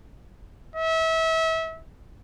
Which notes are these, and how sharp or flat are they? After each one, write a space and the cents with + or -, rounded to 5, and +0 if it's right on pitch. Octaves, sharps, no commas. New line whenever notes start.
E5 -30